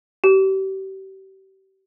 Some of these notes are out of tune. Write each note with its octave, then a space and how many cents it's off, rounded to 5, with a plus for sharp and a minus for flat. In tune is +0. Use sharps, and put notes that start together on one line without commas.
G4 -35